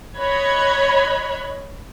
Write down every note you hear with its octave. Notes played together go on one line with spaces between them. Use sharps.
C#5 D#5 B5 F#6 G#6